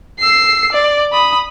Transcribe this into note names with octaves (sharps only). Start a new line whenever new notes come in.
E6 C7
D5
B5 D#6